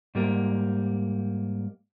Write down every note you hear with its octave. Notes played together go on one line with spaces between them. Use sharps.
G#2 G3 A#3